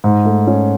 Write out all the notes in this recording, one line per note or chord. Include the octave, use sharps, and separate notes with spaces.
G#2
A3
C#4